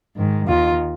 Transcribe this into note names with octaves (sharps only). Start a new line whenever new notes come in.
G#2 D#3
D#2 D#3 F4